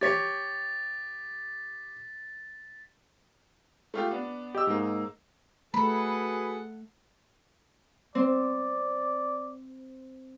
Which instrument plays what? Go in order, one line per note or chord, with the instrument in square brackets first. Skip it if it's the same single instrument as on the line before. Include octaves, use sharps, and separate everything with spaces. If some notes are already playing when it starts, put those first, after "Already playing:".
[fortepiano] G4 C#5 [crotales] A6 B6
[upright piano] A3 F4 G4
B3 D4
[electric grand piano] G4 D#5 E6
[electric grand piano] G#2 [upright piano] A#3 D#4
[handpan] A3 [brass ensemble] F#4 G#4 B4 [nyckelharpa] A4 F#5 [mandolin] B5
[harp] C4 [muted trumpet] D5